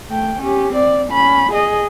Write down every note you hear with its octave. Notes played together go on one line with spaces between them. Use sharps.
A3 G5
C#4 G4
C4 D5
C#4 B5
G#4 D#5